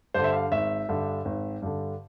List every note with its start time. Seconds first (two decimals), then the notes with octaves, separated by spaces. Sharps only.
0.14 G2 D3 C5
0.24 E5
0.33 F5
0.51 G#1 E5
0.89 G2 D3
1.25 G#1
1.62 G2 D3